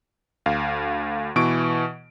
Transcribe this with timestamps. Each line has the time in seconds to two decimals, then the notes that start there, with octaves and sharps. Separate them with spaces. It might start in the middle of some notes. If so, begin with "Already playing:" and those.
0.46 D2 F5
1.36 B2 E3 C#6 D7